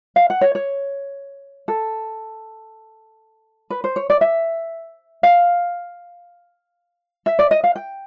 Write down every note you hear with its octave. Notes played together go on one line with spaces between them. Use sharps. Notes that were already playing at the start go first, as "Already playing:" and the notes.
F5
F#5
C#5
C#5
A4
B4
C5
C#5
D5
E5
F5
E5
D5
D#5
F5
G5